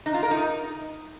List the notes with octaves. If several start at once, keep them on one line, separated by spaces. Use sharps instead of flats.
D#4
F4
A#4
D#4